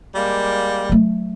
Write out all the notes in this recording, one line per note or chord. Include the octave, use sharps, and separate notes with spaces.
G3 G#3 A#3
F#3 A3